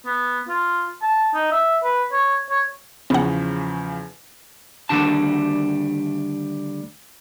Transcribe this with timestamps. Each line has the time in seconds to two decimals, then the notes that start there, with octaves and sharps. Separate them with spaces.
0.06 B3
0.49 F4
1.02 A5
1.34 D#4
1.52 E5
1.84 B4
2.12 C#5
2.50 C#5
3.10 E2 C#3 F3 B3 F#5
4.89 D2 G#2 D#3 G3 D4 A5